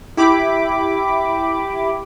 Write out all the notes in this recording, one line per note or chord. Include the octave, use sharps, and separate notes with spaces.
E4 G4 B5 D6